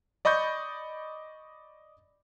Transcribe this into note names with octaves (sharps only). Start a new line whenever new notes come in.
D5 D#5 B5 C#6 G6